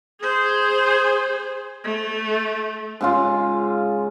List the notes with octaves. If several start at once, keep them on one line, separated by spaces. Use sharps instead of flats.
G#4 C5
A3
G#2 C#3 F4